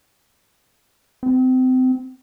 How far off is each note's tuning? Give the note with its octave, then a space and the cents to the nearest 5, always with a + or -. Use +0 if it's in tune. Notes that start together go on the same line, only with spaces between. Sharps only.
C4 -30